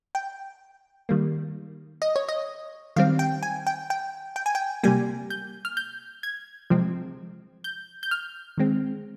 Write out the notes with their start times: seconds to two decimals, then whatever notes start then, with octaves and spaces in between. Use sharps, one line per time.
0.15 G5
1.09 D#3 G3 A#3
2.02 D#5
2.16 C#5
2.29 D#5
2.96 D#3 G3 C4 F5
3.19 G5
3.43 G#5
3.67 G5
3.90 G5
4.36 G5
4.46 G#5
4.55 G5
4.83 C3 G3 A#3 G#5
5.30 G6
5.65 F6
5.77 G6
6.23 G#6
6.70 C3 F3 G#3 C4
7.64 G6
8.03 G6
8.11 F6
8.58 D#3 G#3 C4